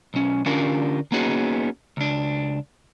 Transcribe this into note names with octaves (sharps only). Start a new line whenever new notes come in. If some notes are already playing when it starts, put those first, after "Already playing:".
B1 C#4
D3 C#4 D4 F4 G4 A#4
A#3 B3 C#4 D#4 F#4 G#4
C#2 D4